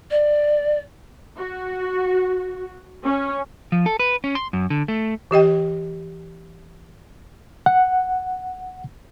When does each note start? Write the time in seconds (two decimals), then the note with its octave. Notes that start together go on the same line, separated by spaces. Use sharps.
0.11 D5
1.37 F#4
3.04 C#4
3.72 F3
3.86 A4
4.00 B4
4.24 C#4
4.35 C6
4.53 F#2
4.70 D3
4.88 A3
5.31 E3 G4 D#5 G5
7.66 F#5